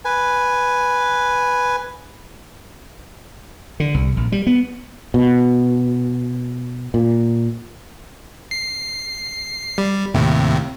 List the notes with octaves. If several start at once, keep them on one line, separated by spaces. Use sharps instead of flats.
B4 G#5
D3
C2
A#1
G3
B3
B2
A#2
C7
G3
D#2 A2 C3